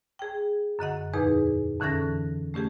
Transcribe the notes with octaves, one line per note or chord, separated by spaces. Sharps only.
G#4 G5
F#2 D3 D#5 F#5
E2 A#2 D#4 G#4 B4
F2 D3 E3 C#4 A4 A#6
A3 C#4 G4 G#4